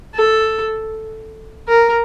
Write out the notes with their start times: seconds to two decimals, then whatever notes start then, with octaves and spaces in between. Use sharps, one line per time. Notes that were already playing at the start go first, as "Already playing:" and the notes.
0.15 A4
1.68 A#4